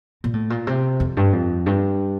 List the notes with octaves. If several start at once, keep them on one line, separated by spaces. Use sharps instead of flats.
A#2
A2
A#2
C3
F2
G2
F2
G2